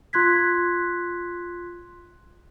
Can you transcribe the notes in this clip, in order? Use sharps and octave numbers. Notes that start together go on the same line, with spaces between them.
F4 C6 F#6 G#6 B6